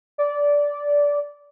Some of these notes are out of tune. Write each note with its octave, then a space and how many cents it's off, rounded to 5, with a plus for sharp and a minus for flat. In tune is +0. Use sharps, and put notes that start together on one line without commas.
D5 -15